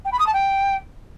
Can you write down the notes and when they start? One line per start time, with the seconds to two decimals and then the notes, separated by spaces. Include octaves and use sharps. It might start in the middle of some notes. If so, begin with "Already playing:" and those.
0.05 G5
0.12 B5
0.19 D#6
0.26 A5
0.33 G5